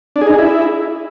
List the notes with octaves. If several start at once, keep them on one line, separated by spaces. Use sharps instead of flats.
D4
G#4
D#4
G#4
E4